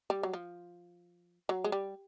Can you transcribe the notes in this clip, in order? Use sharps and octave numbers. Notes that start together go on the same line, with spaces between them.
G3
F#3
F3
F#3
G#3
G3